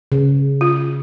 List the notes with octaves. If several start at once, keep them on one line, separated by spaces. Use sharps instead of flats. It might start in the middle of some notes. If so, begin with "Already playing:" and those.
C#3
F4